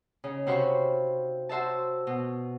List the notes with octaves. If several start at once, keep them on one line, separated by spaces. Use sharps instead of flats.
C#3 D#4
C3 F#4 C5 F5 B5 C#6
F#4 C5 E5 A5
B2